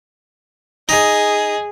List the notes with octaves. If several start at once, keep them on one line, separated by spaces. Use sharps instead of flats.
D#4 G#4